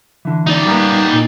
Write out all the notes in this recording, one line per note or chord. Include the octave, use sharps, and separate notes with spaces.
D3 E3
D#4 D5
G3 A#3 B3 G4
A#2